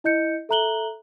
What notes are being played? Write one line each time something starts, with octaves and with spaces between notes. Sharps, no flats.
E4 D#5 G6 C#7
A4 E5 A#5 F#6 F#7 G7